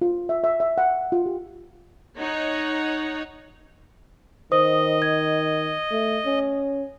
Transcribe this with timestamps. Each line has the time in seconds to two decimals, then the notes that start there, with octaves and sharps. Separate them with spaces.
0.01 F4
0.29 E5
0.44 E5
0.60 E5
0.78 F#5
1.12 F4
1.26 G4
2.17 D#4 C#5 F#5
4.52 D#3 C5 D#5 D#6
5.02 G#6
5.92 A3
6.26 C#4